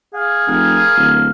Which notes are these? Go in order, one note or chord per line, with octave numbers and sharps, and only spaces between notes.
G#4 F5
F1 A#4 F5
D1